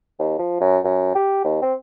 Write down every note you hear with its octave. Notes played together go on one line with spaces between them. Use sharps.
D#2
F3
F#2
F#2
G4
D#2
C4